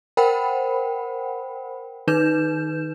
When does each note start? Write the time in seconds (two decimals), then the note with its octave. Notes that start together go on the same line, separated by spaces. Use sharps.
0.17 A#4 C5 F#5 G5 B5
2.08 D#3 D#4 B4 G6 E7